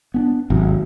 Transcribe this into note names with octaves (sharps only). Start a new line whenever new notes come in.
B3 C#4 D4
G#1 C3 F#3